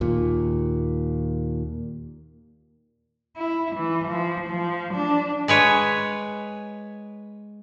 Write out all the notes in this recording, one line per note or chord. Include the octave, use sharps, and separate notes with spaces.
D#2 A#2
E4
E3
F3
F3
D4
G#3 B4 C#5